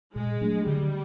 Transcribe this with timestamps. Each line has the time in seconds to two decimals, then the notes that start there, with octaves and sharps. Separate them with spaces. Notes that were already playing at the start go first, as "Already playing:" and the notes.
0.16 A#2 G#3
0.41 F#3 A3 D4
0.67 D3 G3